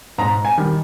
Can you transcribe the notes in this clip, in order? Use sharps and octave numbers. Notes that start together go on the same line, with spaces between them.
G#2 A#5
G#5
D#3 G3